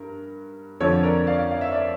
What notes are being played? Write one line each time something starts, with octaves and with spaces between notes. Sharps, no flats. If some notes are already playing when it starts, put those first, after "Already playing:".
Already playing: G2 A#4
F2 D3 F3 A4 C#5
A#4 D5
D5 F5
F5
E5
D5